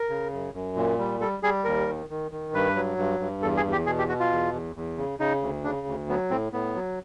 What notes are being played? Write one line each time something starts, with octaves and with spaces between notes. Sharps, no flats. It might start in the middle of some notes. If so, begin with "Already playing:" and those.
Already playing: A#4
C#3
F#2
F#2
A#2
G3
G3 A4
G3 G#4
D#2 A#4
D#3
D#3
D#3
G2 B4
F#3
G2
G2
E2 A4
G#4
E2
G4
B2 G#4
G4
B2 F#4
F4
E2
E2
E2
C#3
C#3 D#4
D2
C#3 D4
D2
F#3 B3
A2 C4
A2 B3
F#3